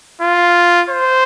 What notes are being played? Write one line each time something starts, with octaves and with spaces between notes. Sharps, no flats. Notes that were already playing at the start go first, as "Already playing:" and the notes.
F4
C5